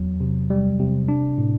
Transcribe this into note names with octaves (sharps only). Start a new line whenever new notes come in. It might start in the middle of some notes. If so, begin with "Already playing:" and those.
Already playing: E2 F#3
C3
G3
C3
D4
A2